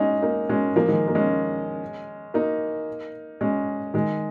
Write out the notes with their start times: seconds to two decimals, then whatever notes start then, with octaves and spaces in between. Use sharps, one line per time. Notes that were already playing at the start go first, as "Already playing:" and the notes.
Already playing: G#3 C#4 D#4
0.22 A#3 D#4
0.49 G#3 C#4
0.76 F3 A#3
0.88 D#3 G#3
1.08 A#3
1.15 G#3 C#4
2.34 A#3 D#4
3.41 G#3 C#4
3.94 D#3 G#3